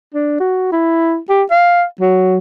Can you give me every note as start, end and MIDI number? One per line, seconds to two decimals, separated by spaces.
0.14 0.38 62
0.40 0.69 66
0.72 1.18 64
1.29 1.43 67
1.51 1.84 77
2.01 2.38 54